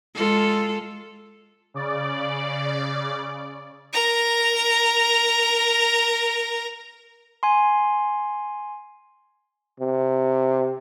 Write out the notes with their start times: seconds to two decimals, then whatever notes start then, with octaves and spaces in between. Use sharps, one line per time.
0.15 G#3 F4 A4
1.74 C#3 D5
3.93 A#4 A#5
7.43 G#5 C6
9.80 C3